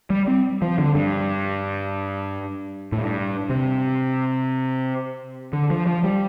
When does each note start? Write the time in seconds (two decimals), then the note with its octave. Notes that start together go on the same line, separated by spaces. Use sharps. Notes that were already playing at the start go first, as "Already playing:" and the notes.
0.10 G3
0.28 C4
0.62 F3
0.78 D3
0.95 G2
2.92 A2
2.98 G2
3.49 C3
5.53 D3
5.70 F3
5.87 F3
6.04 G3